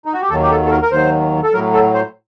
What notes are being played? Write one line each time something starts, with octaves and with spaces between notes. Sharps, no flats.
D#4
F#4
G4
D#2 D#3 F#3 A4
G4
A4
A4
A#4
A#4
D#2 D#3 F#3 C5
A4
A2 F#3 A#4
A4
C5